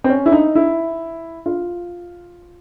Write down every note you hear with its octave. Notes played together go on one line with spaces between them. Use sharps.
C4
C#4
E4
D#4
E4
F4